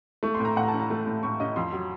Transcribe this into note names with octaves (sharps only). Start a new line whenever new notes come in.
A3 C#6
C6
A2
A#5
A2 F#5
A#5
A5
C#4
A#5
A3
A2
A2 C#6
C#4 D#5
F2 C6
F#3